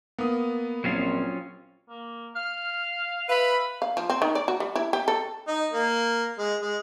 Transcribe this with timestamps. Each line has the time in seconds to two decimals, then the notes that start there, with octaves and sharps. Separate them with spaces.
0.19 A#3 B3 D#6
0.84 A#1 F#3 C4 C#4 F4
1.89 A#3
2.35 F5 F6
3.29 B4 E5 F5 B5
3.82 F5
3.97 F3
4.10 C4
4.22 D#3
4.35 D5
4.48 F#4
4.60 G3
4.75 E4
4.93 G4
5.08 A4
5.48 D#4
5.73 A#3
6.38 G#3
6.62 G#3